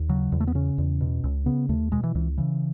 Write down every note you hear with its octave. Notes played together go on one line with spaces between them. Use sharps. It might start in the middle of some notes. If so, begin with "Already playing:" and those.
Already playing: D#2
C#3 F#3
E2
A3
B3
C#3 C#4
E2
B2
C#2
C#3 B3
D#2 A3
B2 G#3
E3
C#2 E3
C#3 E3